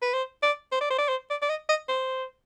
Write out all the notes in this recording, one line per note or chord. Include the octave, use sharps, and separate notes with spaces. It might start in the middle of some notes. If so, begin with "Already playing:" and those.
B4
C5
D5
C5
D5
C5
D5
C5
D5
D5
D#5
D#5
C5